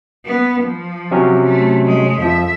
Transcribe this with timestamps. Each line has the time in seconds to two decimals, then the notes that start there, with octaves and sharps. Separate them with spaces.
0.25 B3
0.62 F3
1.11 C3 F#3 C#4
1.46 A3
1.85 G#3 A3
2.18 F2 F3 E5